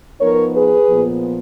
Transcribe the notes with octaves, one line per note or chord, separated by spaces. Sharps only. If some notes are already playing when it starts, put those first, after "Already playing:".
F3 B3 D#4 A#4 C#5
G#4 B4
A#2 F3 B3